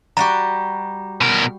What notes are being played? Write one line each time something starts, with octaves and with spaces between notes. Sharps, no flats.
G3 F#4 G4 A#5
B2 A#4